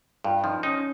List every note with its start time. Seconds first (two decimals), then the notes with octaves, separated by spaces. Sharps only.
0.24 G2 F4
0.44 F3 D#4
0.63 C#4 D#4